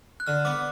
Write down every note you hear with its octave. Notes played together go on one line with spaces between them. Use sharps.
F#6
D3 F6
B3 D6